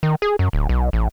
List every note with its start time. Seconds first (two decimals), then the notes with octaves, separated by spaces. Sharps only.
0.03 D#3
0.22 G#4
0.39 F#2
0.53 D1
0.69 B1
0.93 A1